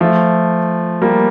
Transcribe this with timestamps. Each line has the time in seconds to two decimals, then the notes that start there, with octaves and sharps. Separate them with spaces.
0.01 F3 A3
1.02 G3 A#3